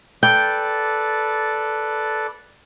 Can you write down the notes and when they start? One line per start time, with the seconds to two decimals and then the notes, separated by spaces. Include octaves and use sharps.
0.23 A4 B4 D5 G5